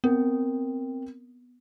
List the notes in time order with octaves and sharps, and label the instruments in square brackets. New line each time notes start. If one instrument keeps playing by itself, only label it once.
[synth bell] B3 [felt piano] C4 A#4